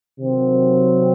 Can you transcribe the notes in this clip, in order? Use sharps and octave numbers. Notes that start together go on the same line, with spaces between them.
C3 D#3 F#3 C4